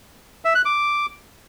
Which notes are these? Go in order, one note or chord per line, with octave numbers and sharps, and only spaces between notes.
E5
F#6
D6